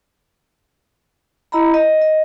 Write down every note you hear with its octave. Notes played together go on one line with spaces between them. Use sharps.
E4 D#5 A#5 B5
D#5
D#5